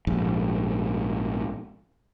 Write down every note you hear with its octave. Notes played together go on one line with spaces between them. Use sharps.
A#1 G#2